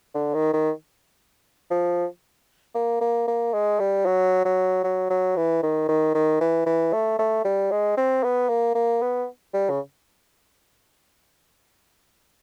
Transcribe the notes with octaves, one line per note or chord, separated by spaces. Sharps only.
D3
D#3
D#3
F3
A#3
A#3
A#3
G#3
G3
F#3
F#3
F#3
F#3
E3
D#3
D#3
D#3
E3
E3
A3
A3
G3
G#3
C4
B3
A#3
A#3
B3
G3
C#3